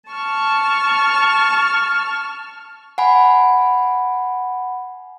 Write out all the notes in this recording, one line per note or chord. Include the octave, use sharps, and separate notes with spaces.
A5 C#6 F6
F#5 G#5 B5